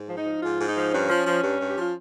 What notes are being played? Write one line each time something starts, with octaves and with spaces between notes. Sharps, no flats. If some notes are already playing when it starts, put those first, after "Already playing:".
Already playing: G#2
F3
D#4
F3
G#2 F4
G#2
D#4
F3
G2 C#4
F3
F3
G2
G2
G4
F3 F4